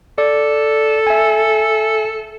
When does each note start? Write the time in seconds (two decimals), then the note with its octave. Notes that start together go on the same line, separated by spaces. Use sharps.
0.18 A4 D5
1.07 E5 G#5